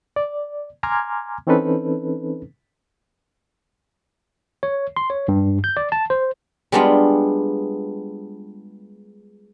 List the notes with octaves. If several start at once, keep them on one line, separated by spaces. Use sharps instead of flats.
D5
G#5 A#5 C6 D6 F6 G#6
E3 C4 C#4 D#4 A4 B4
C#5
C6
C#5
G2
G6
D5
A5
C5
G3 G#3 B3 D4 F4